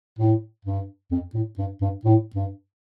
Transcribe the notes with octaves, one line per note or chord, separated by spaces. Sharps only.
A2
G2
F2
A2
G2
G2
A2
G2